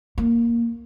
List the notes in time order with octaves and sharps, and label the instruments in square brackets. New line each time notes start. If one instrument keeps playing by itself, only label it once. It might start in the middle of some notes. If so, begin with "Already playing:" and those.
[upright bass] A#3